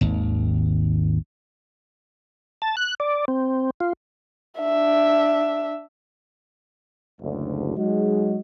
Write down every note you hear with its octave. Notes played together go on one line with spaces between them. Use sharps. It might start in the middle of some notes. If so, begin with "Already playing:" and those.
G#1 D#2
A5
F#6
D5
C4
F4
D4 E5
F#1 D2
F#3 G#3 D#4 F#4 G#4 D#5